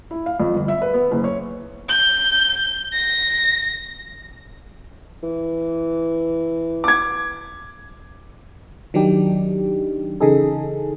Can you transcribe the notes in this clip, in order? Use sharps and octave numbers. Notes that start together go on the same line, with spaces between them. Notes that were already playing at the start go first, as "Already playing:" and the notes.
E4
F5
F2
G1
E5
B4
B3
F#1
C#5
G6
A#6
E3
D6 G#6
D#3 F#3 D4 D#4 G4
C#3 E3 D#4 G#4 A4